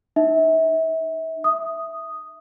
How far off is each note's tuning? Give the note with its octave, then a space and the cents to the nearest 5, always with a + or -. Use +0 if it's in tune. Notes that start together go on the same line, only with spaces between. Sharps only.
D#4 -35 E5 -35
E5 +0 D#6 +0